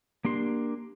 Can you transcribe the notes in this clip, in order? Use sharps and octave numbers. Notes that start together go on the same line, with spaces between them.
A#3 D4 G4 C6